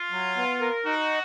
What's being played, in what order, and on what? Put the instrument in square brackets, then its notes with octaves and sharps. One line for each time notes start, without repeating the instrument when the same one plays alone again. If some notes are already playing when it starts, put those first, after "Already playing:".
Already playing: [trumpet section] F4
[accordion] F#3
B3
A#4
[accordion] D#4 [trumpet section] F#4